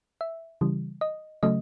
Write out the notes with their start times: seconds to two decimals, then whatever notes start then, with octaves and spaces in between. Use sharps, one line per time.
0.21 E5
0.61 C#3 E3 G3
1.01 D#5
1.43 C#3 F#3 A3 D#5